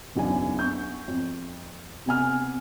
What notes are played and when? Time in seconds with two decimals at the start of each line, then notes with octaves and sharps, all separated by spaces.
0.16 F#1 B1 E2 D4 G#5
0.59 B3 C#6 G6
1.08 F2
2.06 C3 B3 G#5 F6